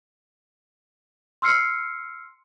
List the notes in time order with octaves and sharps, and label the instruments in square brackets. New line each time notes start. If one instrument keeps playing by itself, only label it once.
[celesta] C6 E6 F6 C7 C#7